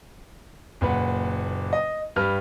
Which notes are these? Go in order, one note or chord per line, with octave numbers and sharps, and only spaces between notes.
F#1 A#2 B4 F#5
D#5
G2 G3 B4 F6